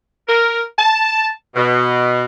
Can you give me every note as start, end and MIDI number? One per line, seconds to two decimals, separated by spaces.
0.28 0.62 70
0.77 1.28 81
1.55 2.25 47